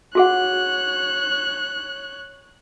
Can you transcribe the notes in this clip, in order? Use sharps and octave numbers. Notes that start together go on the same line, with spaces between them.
F#4 G#4 C#5 F#5 F#6